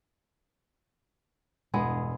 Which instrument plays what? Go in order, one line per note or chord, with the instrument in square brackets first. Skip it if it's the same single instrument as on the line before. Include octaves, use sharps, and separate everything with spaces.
[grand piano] E1 G2 [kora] G#3 B3 G#4